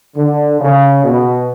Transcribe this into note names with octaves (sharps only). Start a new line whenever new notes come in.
D3
C#3
B2